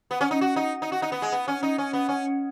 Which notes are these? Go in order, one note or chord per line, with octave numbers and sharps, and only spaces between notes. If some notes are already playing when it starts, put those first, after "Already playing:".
B3
C#4
D#4
F#4
D#4
D#4
F#4
D#4
B3
G#3
B3
C#4
D#4
C#4
B3
C#4